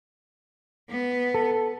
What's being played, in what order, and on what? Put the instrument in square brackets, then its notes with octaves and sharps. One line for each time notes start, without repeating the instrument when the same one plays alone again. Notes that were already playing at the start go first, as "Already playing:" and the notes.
[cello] B3
[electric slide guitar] A4